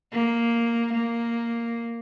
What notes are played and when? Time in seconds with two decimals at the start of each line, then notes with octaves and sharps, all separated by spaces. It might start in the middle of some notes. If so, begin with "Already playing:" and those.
0.13 A#3
0.94 A#3